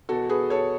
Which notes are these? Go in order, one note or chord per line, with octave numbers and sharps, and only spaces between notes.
E2 B2 F#4 A4
G#4 B4
A4 C#5